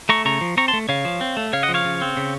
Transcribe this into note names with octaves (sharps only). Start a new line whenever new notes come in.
A3 A#5 C#6
C#3 A#5 C#6
F3
C4 A#5 C#6
A5 C6
A3
C#3 C#5 F5
F3
C4
A3
C#3 C#5 F5
D#5 F#5
F3
C#5 F5
C#3
C4
C#3